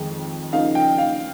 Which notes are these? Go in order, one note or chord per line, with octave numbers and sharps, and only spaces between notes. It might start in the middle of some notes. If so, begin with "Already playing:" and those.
Already playing: F2 D#3 G#3
C#3 F3 A#3 D#4 F5
G5
F5